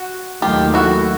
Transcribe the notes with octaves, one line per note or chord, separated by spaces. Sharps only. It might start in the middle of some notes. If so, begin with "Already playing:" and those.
Already playing: F#4
D#2 D#3 F#3 A3 F4 G4
E4 F#4